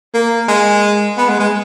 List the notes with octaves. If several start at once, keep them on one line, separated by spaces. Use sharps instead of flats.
A#3
G#3
B3
G#3
G#3